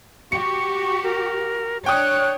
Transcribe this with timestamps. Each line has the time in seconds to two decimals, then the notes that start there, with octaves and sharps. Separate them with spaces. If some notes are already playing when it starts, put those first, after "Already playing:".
0.32 F#4 G4 C#6 C#7
1.04 A#4
1.86 D4 C#5 G5 D#6 F#6